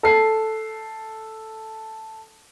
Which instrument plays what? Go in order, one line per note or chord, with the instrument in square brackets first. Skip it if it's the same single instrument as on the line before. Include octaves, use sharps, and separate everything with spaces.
[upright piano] A4 C7